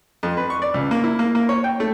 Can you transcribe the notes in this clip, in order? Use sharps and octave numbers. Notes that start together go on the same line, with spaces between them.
F2
B4
C#6
D5
C#2
A#3
E4
A#3
A#3
C#5
G5
A3